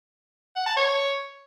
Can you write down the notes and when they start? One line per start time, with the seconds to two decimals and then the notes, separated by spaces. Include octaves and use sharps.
0.56 F#5
0.66 A5
0.76 C#5